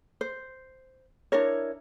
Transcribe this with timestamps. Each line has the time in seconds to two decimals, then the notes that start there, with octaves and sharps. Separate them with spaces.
0.21 C5
1.32 D4 E4 A#4 C#5